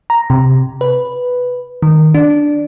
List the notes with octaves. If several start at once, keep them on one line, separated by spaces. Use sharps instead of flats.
A#5
C3
B4
D#3
D4